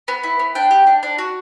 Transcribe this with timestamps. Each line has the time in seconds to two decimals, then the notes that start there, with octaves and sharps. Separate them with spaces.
0.08 B3
0.23 E4
0.39 B3
0.55 D4 G5
0.71 G4
0.87 D4
1.03 D4
1.18 F#4